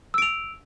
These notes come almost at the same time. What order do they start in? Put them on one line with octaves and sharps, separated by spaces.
E6 D7 F7